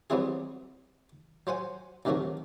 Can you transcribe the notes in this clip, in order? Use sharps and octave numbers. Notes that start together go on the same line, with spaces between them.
F#3 G3 B3 C4 E4 G#4
F#3 C5 F#5 G#5
D2 C3 D#3 F#3 A3 F#4